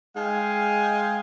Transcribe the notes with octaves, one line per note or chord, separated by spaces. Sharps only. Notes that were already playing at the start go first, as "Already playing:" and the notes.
G#3 F5 G5 G#5